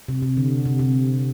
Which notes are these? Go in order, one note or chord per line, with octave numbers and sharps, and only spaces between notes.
C3
C3
D3
C3
C3